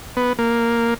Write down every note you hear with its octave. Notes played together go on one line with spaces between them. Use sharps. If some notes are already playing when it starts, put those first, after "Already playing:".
B3
A#3